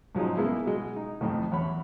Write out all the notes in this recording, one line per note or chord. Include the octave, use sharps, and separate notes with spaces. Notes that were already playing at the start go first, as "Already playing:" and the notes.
G#2 F3 F#3 G#3 D#4
G#3 A#3 B3 E4
B2 G#3
D#4
F2 A2 D#3
E2 C#5 B5